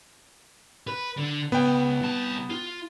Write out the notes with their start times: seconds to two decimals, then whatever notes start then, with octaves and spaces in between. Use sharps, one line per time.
0.87 B4
1.17 D3
1.52 C#2 B3 G5
2.02 C2 A5
2.50 F4